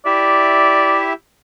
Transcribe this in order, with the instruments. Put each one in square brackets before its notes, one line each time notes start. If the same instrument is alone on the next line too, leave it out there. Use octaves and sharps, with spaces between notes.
[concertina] E4 G4 E5 [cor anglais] D5